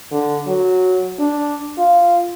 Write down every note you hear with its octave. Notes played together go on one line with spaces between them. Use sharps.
D3
F#3
D4
F4